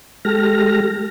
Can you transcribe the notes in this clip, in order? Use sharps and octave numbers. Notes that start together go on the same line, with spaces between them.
G#3 G4 A4 F6 A#6